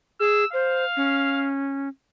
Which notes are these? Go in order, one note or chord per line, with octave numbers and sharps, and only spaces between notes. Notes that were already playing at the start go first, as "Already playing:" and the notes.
G#4 E6
C5 F5
C#4